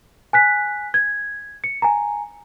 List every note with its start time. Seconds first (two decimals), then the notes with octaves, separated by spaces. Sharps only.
0.33 G#5 F#6 B6
0.94 G#6
1.64 C#7
1.82 G#5 A#5